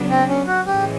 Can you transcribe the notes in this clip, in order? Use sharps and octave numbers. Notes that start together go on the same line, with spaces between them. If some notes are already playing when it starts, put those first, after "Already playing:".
Already playing: C#3 F#3 B3 D4
C4
C#4
F#4
A2 E3 G#3 C#4 G4